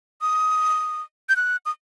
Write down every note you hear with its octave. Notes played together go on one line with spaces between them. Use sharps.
D#6
G6
F#6
D#6